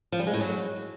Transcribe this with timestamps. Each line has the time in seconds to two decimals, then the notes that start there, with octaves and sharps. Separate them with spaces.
0.12 F3
0.19 G3
0.27 G#3
0.34 A2
0.41 F#3